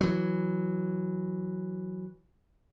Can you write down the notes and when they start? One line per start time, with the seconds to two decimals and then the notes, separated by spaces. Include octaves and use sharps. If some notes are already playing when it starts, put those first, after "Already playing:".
0.01 E3 F#3